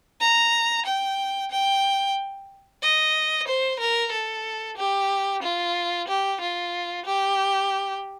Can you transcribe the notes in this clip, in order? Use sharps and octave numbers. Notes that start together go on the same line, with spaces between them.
A#5
G5
G5
D#5
C5
A#4
A4
G4
F4
G4
F4
G4